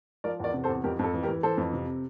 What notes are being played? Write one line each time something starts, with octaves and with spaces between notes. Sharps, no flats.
F3 A#4 D5
E2 A#4 D5
C3
A4 C5
E2
F2 G4 A#4
F2 A4
E3
G4 A#4
E3
E3 A4 C5
F2
C3